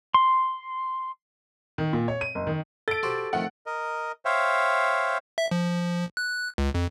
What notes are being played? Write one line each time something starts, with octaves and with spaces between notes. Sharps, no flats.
C6
D#3
A#2
C#5
D#7
F#1
D#3
A4 A6 D7
F#4 G4 C5
F2 A2 D#3 F#5
A#4 D#5
C5 C#5 E5 F5 G5
E5
F3
F#6
C#2
F2